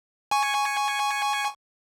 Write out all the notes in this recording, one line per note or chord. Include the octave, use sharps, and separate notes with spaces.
G#5 C#6